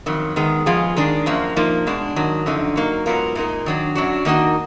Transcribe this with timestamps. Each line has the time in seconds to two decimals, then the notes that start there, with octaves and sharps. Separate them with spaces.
0.06 F2 D#3 F#3
0.36 D#3 G#3 B3
0.66 F3 G#3 B3 F4 G#4
0.97 D#3 G#3 D4 G#4
1.26 F#2 F3 A#3
1.56 F3 A#3 D#4
1.87 B2 G#3 D4
2.16 G#2 D#3 F#3
2.46 F#2 D3 F3 D#4
2.76 F#3 A#3 D#4
3.06 G#2 F#3 B3 F4 A#4
3.36 A#2 G#3 D#4 A#4
3.66 D#3 F#3 D4
3.95 F#2 D#3 F#3 D4 F#4
4.25 D#3 A#3 D#4 F#4 A#4